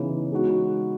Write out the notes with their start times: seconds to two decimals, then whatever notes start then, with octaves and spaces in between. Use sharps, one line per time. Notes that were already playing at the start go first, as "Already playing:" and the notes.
Already playing: C#3 E3 B3 D#4
0.32 G#3 D#4 F#4